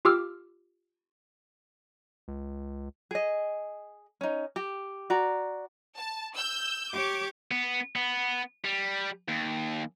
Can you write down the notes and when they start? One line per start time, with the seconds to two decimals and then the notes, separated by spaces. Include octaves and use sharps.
0.05 F4 G4 D6 E6 F6
2.28 C#2
3.11 G#4 D#5
4.21 C#4 D#4
4.56 G4
5.10 F#4 D5 A#5
5.97 A5
6.35 E6 G6
6.93 G4 C#5 D6
7.51 B3
7.96 B3
8.65 G3
9.29 D#2